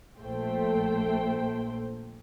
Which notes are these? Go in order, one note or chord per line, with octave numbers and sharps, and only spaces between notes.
A#1 A#2 A3 C5 G5